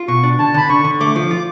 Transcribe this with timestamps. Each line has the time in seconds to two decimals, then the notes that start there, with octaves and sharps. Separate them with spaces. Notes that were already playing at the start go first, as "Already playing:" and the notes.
Already playing: F4
0.08 B2 C#6
0.24 D4
0.39 D3 A5
0.54 D3 B5
0.69 D3 C#6
0.84 D3
1.00 A3 D6
1.16 F3
1.31 F4